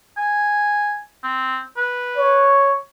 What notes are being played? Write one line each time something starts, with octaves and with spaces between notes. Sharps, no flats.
G#5
C4
B4
C#5